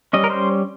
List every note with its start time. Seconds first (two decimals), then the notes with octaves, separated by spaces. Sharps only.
0.13 G3 C#4 D#5
0.24 A#4
0.30 C5